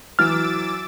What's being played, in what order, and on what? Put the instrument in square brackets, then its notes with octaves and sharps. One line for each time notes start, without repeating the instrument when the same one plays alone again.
[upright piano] E3 F#3 [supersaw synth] D6 E6 A6 [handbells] F6